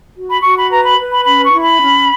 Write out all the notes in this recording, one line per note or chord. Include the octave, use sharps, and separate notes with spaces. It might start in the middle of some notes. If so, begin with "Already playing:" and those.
F#4
B5
F#4 C#6
B5
B4 A#5
B5
B4
B5
C#4 B5
C#6
E4
B5
C#4